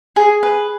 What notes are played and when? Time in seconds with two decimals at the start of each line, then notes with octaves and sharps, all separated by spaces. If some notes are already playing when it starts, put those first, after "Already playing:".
0.16 G#4
0.43 B4